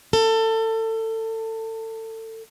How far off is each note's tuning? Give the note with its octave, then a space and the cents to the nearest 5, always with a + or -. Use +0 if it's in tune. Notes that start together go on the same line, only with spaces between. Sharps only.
A4 +25